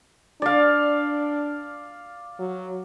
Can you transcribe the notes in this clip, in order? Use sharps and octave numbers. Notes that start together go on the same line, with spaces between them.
D4 D5 F5
F#3